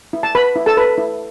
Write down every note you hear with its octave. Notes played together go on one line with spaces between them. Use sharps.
E4
A5
B4 B5
E4
A4 A5
B4
E4